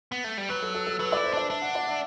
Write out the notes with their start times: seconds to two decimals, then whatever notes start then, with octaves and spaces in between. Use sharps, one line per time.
0.12 B3
0.24 A3
0.38 G3
0.49 F#3 B4
0.63 A4
0.75 A4
0.87 A4
0.99 F#3 B4
1.12 D5
1.17 E4
1.25 C5
1.34 D4 D5
1.50 D4 E5
1.62 F#5
1.75 D5
1.87 E5